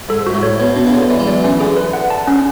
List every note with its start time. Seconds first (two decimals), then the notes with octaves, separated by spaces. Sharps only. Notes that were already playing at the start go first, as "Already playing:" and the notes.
0.09 G#2 A4
0.27 G#2 F#4
0.34 A2
0.43 C#5
0.60 B2 C#5
0.76 B2 D4
0.87 C#3
0.93 D3 C#5
1.10 E3 D5
1.19 G#3
1.27 F#3 D5
1.44 E3 C#4
1.60 D3 G#4
1.77 B4
1.93 F#5
2.10 A5
2.27 C#4